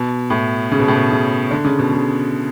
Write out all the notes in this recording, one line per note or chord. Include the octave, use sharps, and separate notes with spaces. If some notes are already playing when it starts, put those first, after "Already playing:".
Already playing: B2
A2
C#3
B2
A2
B2
C#3
D3
C#3
B2
C#3